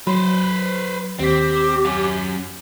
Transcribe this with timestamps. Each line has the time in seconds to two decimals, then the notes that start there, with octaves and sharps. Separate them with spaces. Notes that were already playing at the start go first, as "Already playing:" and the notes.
0.07 F#3 B4 C5
1.19 D#2 C4 G4 B6
1.85 F#3 C#4